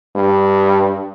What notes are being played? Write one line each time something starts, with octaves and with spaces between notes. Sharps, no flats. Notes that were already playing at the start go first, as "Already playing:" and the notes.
G2